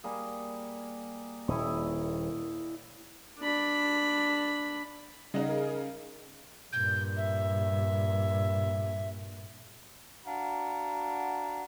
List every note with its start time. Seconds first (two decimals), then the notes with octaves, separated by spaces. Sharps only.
0.04 G3 A#3 G#4
1.48 D#1 E4 D#5 C#6
3.40 D4 B5
5.34 C#3 G3 D#4 D#5 F#5
5.48 G#4 A#4
6.72 G2 A#2 G6
7.16 E5
10.25 D4 F#4 F5 F#5 A#5